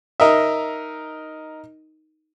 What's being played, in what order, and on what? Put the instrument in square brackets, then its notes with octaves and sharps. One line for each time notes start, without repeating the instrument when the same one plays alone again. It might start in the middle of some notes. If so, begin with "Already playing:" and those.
[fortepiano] D#4 A#4 D#5 E5